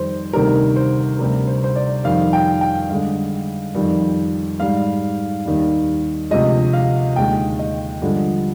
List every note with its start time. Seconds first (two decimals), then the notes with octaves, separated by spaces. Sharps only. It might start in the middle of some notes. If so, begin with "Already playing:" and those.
Already playing: F2 D#3 G3 C5
0.33 D2 C3 D#3 G3 A#4
0.76 C5
1.19 D2 C3 G3 A#4
1.47 C5
1.64 C5
1.76 D5
2.04 F2 D#3 G3 F5
2.33 G5
2.61 G5
2.90 G2 D3 G#3 F5
3.75 F2 D#3 G3
4.60 G#2 G3 F5
5.46 D#2 D#3 G3
6.31 D2 C3 F3 G#3 D#5
6.73 F5
7.16 D#2 D3 G#3 G5
7.59 D#5
8.01 G2 D3 F3 G#3